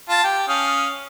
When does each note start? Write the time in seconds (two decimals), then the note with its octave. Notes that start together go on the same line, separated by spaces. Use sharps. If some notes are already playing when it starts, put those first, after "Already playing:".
0.09 F4 A5
0.24 G4
0.48 C#4 F5 D#6